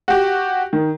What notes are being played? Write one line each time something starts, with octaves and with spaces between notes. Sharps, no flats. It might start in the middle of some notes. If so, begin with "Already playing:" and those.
F#4 G4
D#3